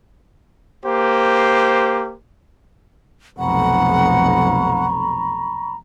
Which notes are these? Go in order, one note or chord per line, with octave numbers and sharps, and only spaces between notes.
A#3 G4 C5
F1 B1 F#5 A#5 B5 C#6